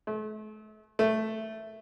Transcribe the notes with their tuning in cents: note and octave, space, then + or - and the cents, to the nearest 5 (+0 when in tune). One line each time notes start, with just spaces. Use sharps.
A3 -40
A3 +0